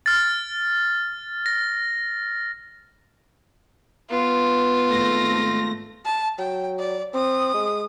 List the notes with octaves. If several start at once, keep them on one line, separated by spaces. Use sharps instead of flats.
F6 A6
A#6
B3 F4
G#1 A3 A#6
A5
F#3 G5
D5
C4 D#6
G#3